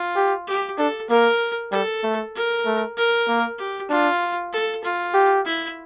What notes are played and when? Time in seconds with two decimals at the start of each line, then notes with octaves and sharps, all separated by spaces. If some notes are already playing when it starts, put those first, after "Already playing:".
Already playing: F4
0.16 G4
0.47 G4
0.78 D4 A4
1.09 A#3 A#4
1.72 G3 A4
2.03 A3
2.35 A#4
2.66 A3
2.97 A#4
3.28 A#3
3.58 G4
3.90 D4 F4
4.53 A4
4.84 F4
5.14 G4
5.46 E4